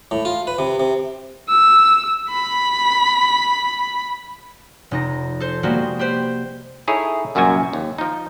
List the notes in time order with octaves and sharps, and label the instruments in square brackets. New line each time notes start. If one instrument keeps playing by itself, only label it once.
[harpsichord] A2
F4
B4
C3
C3
[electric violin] E6
B5
[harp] F1 D#4 A#6
A4 C5
G3 G#3 A#3 B3 F#4 C5
G4 B4 C5
[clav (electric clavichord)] D#4 E4 G#4 A4 C#5
C2 F#2 A#2 F3 F#4 G#5
D#2
F3 D#4